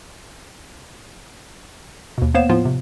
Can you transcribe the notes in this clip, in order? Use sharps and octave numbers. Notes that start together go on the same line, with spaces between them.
D#2 B2
A#3 B3 C5 C#5 F5 E7
A2 F3 B3 F4
C3